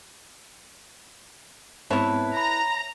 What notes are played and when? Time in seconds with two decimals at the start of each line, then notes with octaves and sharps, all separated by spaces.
1.90 G#2 B3 C4 E4 B4 C#5 E5 A5
2.37 A#5 B5